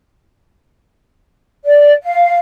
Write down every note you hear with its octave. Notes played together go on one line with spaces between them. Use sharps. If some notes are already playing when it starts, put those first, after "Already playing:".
D5
F5